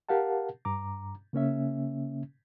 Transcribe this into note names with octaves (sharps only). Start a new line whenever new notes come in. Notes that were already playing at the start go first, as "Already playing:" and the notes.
G4 A#4 F5 F#5 A5
G2 A#5 D6
C#3 A#3 C#4 E5